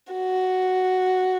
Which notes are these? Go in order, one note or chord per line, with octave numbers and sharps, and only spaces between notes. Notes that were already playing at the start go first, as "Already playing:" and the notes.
F#4